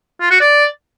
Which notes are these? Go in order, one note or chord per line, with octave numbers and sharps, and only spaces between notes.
F4
F#4
D5